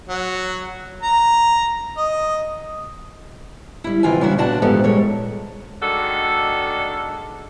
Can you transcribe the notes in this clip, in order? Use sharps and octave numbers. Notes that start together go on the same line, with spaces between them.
F#3
A#5
D#5
G3 E4
C3 D#3 E3 F4 G5 G#5
C#3 G3 A#3 D4 E4 F#4
A#2 B3 D4 F#4 D5 A5
E2 G#2 F3 B3 G4 A4
A#2 G3 G#3 A4 C#5
D#3 G#3 D4 F#4 A4